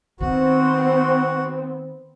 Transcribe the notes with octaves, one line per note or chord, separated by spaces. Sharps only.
D#3 B3 C4 F#4